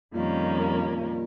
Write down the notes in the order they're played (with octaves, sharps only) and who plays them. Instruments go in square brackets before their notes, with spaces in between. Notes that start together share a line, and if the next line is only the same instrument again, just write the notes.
[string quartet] F2 D#3 G3 A#3 C#4 [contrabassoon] A#2